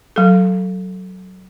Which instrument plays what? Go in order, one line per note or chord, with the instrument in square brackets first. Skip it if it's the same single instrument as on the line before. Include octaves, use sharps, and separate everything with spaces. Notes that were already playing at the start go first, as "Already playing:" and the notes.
[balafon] F#3 A4